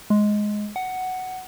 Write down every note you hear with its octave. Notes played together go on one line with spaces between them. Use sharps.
G#3
F#5